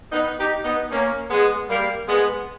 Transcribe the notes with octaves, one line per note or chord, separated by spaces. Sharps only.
B3 D#4
D#4 G4
B3 D#4
A#3 C#4
G#3 B3
G3 A#3
G#3 B3